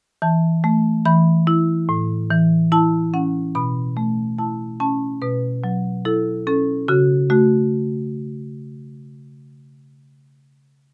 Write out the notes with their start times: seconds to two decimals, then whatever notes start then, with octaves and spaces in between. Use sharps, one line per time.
0.22 E3 A5
0.64 A3
1.05 E3 B5
1.47 E4
1.89 A2
2.31 E3
2.72 E4 A5
3.14 C#4 F#5
3.55 B2 B5
3.97 A3
4.39 E4 A5
4.80 C#4 A5
5.22 B2 B4
5.64 F#3
6.05 E4 A4
6.47 C#4 A4
6.88 C#3 F#4
7.30 A3 F#4